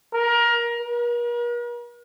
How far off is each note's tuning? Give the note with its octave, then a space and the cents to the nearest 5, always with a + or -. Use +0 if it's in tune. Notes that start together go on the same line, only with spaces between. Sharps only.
A#4 +20
A#4 +45